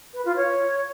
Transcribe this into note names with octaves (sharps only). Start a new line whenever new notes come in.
B4
F4
C#5